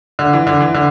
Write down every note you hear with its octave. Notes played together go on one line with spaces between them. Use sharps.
D3
E3
D3
E3
D3